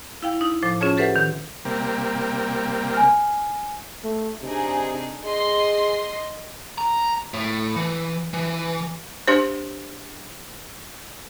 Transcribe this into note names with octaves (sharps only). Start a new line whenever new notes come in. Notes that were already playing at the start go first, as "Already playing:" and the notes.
E4 F5 G5
D#4 E4
A2 F3 C5 D6
C#4 F4 G#4 C#5 A5
G4 A4 B4 C5 E5 F#5
D#3
C3 G3 A#3
G#5 F6
A3
C3 D4 D#4 G#4
G#4 D#5 C6
A#5
A2
E3
E3
D4 G4 C5